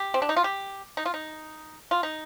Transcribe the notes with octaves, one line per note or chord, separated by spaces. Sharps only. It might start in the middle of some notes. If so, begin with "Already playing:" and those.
Already playing: G4
C4
D4
D#4
F4
G4
D#4
F4
D#4
F4
D#4